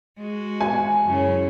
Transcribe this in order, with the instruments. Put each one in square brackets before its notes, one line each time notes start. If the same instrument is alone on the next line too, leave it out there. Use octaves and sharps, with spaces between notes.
[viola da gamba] G#3 F#4
[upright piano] G#5
[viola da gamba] F#2 C#3 E4